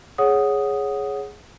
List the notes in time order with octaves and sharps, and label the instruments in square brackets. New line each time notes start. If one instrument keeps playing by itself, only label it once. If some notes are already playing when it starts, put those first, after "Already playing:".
[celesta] G#4 C#5 F#5 D#6